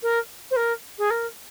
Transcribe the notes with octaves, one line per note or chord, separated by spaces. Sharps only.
A#4
C5
A#4
G#4
A#4